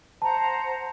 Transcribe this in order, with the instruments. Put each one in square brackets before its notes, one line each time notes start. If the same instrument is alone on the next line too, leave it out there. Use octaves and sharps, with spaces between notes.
[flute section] C5 F#5 A#5 [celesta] A5